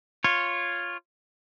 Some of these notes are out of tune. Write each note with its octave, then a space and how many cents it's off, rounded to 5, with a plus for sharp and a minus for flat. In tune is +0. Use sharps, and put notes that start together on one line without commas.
F4 +0 C#5 -5